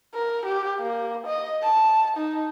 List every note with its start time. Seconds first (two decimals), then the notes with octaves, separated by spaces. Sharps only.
0.14 A#4
0.46 G4
0.79 A#3
1.27 D#5
1.63 A5
2.17 D#4